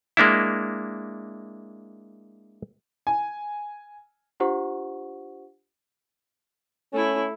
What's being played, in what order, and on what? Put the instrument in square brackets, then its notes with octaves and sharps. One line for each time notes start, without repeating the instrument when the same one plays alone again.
[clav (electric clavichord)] G#3 A#3 D4 E4
[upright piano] G#5
[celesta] D4 F4 G4 C5 F#5 C#6
[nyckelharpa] A3 E4 [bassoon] C#4